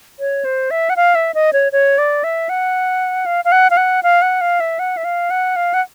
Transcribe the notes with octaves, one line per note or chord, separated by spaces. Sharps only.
C#5
C5
E5
F#5
F5
E5
D#5
C#5
C#5
D5
E5
F#5
F5
F5
F#5
F5
F#5
F5
F#5
F5
E5
F#5
E5
F5
F#5
F5
F#5